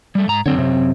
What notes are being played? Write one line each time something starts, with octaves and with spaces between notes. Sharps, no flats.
G3 A3
G#2 A#5
F#2 D3 C4 C#5
C3